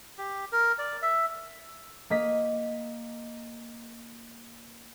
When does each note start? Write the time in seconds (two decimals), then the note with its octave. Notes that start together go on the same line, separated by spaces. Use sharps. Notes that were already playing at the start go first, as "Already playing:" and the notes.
0.18 G4
0.52 A#4
0.78 D5
1.02 E5
2.10 A#3 D#5 B6